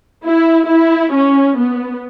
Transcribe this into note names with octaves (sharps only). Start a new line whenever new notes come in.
E4
E4
C#4
B3